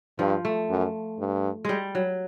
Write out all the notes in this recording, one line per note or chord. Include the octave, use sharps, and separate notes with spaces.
G2 F3
A3
F#2
G2
G3 G#3
F#3